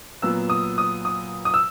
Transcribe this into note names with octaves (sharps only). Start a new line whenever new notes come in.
A#2 F#3 B3 E6
D#6
D#6
D#6
D#6
E6